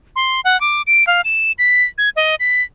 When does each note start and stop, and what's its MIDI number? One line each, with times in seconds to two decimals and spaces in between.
0.16 0.41 84
0.45 0.59 78
0.61 0.82 86
0.87 1.07 98
1.07 1.21 77
1.25 1.52 100
1.59 1.83 95
1.98 2.09 92
2.16 2.35 75
2.40 2.62 95